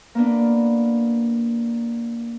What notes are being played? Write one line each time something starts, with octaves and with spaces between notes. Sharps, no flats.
A#3 B3 D4